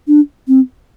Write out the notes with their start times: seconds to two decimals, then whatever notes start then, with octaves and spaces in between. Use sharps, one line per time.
0.08 D4
0.48 C4